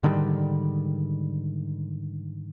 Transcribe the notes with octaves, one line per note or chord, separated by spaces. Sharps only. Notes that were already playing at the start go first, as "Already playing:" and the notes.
G#2 D3 D#3 G3